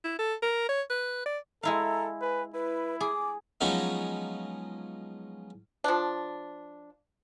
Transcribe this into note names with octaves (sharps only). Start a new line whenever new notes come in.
E4
A4
A#4
C#5
B4
D5
G#3 E4 A4 F5 A#5
B4 G#5
E4 B4
G#4 D6
F3 F#3 G#3 B3 C#4 D#4
F3 D4